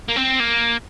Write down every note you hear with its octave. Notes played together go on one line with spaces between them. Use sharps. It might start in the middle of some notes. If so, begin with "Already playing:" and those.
A#3
C4
A#3